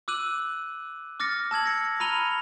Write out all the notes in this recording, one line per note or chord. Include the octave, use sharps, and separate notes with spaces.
D6 E6 F#6 D#7 F#7
D6 F6 A6 A#6 C#7
A5 E6 G#6 F#7
A#6 C#7
A#5 B5 F6 D#7 F7 G7